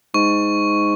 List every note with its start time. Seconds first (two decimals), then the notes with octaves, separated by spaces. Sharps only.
0.14 G#2 C#6